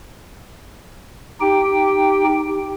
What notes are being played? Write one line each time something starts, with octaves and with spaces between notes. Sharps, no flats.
D#4 G4 G5